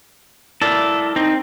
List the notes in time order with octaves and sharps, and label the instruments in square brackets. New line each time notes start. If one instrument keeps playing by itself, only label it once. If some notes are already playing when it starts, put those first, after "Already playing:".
[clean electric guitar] E4 A#4 D5 [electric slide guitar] A4
[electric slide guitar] C4 [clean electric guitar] D#4